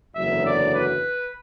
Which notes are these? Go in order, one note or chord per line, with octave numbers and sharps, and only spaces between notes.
F#1 E2 D3 F#3 E5
D5
B4